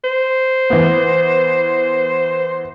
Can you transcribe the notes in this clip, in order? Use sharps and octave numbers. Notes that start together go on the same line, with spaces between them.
C5
E3 B3